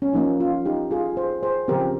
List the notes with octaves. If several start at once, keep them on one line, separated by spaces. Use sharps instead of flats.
C#4
F3 A#3 C#4 D#4
C#4 F4
D#4 G4
F4 G#4
G#4 C5
G#4 C5
C#3 F3 C4 G4 A#4